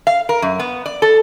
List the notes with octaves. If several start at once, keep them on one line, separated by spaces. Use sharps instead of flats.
F5
A#4
F#2
B3
D5
A4